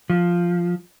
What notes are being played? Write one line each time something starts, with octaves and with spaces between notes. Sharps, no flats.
F3